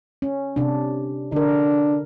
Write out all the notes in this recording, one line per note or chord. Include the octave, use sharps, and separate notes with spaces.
C#4
C3 D4
D3 D4 A#4